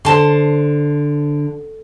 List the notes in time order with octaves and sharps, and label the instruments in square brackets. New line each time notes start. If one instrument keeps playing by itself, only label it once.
[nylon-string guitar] D3 [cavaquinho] C5 A5 C6